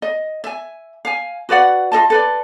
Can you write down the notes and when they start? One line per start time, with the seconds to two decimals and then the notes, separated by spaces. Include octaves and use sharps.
0.02 D#5
0.44 E5 G#5
1.05 F5 G#5
1.49 F#4 B4 D5 F#5
1.92 F4 A4 D#5 A5
2.10 A4 B4 D5